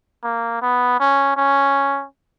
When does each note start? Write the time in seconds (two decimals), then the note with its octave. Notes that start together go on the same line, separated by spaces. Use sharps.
0.24 A#3
0.62 B3
1.00 C#4
1.37 C#4